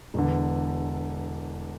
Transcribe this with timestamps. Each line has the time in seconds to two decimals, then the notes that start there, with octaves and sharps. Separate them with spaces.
0.14 E1 E2 D3